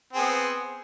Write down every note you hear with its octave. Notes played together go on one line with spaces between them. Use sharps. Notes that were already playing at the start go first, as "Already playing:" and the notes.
B3 C4 G#4